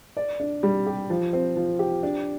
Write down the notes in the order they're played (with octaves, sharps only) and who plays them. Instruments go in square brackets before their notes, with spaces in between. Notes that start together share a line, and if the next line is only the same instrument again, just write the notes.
[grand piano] D5
D4
G3
G4
F3
C4
F3
G4
D4